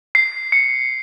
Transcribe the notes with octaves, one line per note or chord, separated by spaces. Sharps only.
C7
C#7